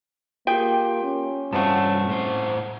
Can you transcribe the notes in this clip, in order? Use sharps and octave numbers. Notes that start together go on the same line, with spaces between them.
A#3 F4 G4 G#4 G5
C#4
G2 F3 F#3 A3 C4 F#5 A5
A2 C5